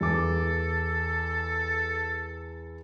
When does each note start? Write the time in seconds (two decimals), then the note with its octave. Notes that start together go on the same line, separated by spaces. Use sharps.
0.01 E2 A4 D6